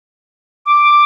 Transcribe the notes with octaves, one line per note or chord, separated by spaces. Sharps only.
D6